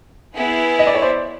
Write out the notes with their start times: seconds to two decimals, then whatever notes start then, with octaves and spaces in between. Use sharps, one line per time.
0.35 B3 E4 G#4
0.79 D#5
0.87 D5
0.95 C#5
1.02 C5 D5